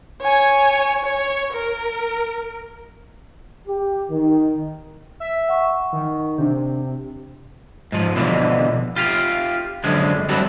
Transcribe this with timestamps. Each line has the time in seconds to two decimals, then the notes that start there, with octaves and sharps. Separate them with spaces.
0.22 C#5 G#5
1.05 C#5
1.53 A#4
3.67 G4
4.10 D#3
5.20 E5
5.49 F#5 C#6
5.92 D#3
6.38 C3 D4
7.92 G#2 F3
8.16 B2 D3 E3 F3
8.96 F4 G4 F5
9.84 F#2 D3 F3 G#3
10.29 G3 C4 E4 F#4 A4